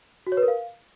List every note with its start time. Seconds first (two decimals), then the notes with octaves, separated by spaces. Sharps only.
0.27 F#4
0.32 C#5
0.37 B4
0.43 A#4
0.48 F5